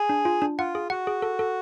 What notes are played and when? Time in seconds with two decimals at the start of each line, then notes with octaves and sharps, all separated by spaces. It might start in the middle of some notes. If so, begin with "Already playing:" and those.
Already playing: G#4
0.09 D4
0.25 F4
0.42 D4
0.59 F4 F#5
0.75 G#4
0.90 F#4 F#5
1.07 G#4
1.22 A4
1.39 A4